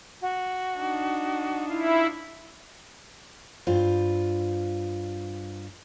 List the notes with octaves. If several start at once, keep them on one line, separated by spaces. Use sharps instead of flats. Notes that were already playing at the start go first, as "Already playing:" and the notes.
F#4
D4 D#4
E4 F4
G2 F4 C5